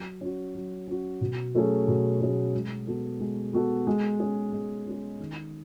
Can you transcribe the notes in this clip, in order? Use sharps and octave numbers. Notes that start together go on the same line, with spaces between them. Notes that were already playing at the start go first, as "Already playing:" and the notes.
Already playing: F#3
C#4 F#4
F#3
C#4 F#4
B2
F#3 A3 C#4 G#4
B2
F#3 A3 C#4 G#4
G#3
B3 F#4 A4
G#3
B3 F#4 A4
G#3
C#4 G#4
G#3
C#4 G#4
D#3